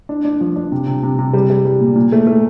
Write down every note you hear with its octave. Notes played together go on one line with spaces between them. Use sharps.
D4
D4
F3
D4
C3
C3
C3
C3
G3
G3
G3
A#2
A#2
A3
A3